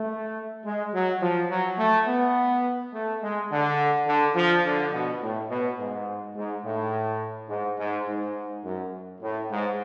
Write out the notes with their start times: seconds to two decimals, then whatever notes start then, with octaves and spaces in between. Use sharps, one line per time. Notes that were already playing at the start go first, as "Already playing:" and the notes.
Already playing: A3
0.65 G#3
0.93 F#3
1.21 F3
1.50 F#3
1.78 A3
2.07 B3
2.93 A3
3.22 G#3
3.50 D3
4.07 D3
4.35 F3
4.64 D3
4.92 B2
5.21 A2
5.50 B2
5.79 G#2
6.35 G#2
6.64 A2
7.49 G#2
7.78 G#2
8.06 G#2
8.64 F#2
9.21 A2
9.49 G#2